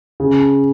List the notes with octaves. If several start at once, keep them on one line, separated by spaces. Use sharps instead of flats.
C#3